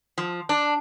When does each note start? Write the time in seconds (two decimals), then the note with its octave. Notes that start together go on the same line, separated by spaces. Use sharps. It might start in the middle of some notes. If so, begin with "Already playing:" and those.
0.18 F3
0.49 D4